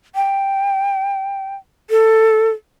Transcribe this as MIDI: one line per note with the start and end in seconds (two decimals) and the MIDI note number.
0.15 1.55 79
1.90 2.50 69